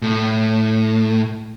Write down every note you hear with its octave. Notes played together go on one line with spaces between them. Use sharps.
A2